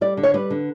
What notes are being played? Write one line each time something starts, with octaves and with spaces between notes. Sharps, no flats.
G3 D5
D3
C#5
G3 B4
D3